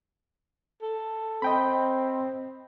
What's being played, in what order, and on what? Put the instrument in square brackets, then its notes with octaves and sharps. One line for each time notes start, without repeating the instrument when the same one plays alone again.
[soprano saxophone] A4
[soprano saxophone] C4 [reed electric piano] D#5 G5 B5